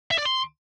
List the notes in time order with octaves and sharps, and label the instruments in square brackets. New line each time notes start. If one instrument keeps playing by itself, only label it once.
[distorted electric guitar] E5
D5
C6